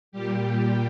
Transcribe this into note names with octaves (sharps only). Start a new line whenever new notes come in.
A#2 G3 G4